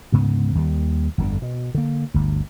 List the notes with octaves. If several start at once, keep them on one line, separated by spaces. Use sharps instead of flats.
D2 G#2 C#3 B3
D#2 D#3 G3
G1 F2 A#2 D3
B2
D3 A#3
G1 D2